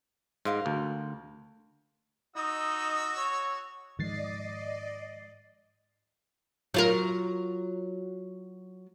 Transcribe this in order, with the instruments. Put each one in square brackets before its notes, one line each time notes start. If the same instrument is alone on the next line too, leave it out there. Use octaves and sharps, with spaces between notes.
[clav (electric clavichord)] G#2 [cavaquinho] A#4 F5 C6
[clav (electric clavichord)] D2
[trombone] D#4 [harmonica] F#4 E6 [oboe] D#5
[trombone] C#5
[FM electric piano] G#2 A6 C7 [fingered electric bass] D#3 F3 G#3 [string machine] D5 D#5
[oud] F#3 F4 A#4